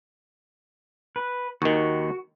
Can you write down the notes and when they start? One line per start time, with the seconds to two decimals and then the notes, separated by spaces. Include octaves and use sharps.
1.16 B4
1.62 D#2 D#3 F#4